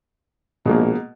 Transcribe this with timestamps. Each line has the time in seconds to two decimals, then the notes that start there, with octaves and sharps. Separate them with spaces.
0.65 A#1 B2 G#3 A#3